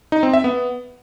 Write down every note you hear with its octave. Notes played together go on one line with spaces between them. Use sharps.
D#4
C4
E5
B3